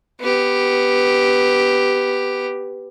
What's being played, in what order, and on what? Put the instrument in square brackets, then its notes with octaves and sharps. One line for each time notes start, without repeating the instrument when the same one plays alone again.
[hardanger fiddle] B3 G4